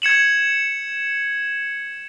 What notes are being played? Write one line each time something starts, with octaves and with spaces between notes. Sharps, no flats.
G#6 C#7 E7 F#7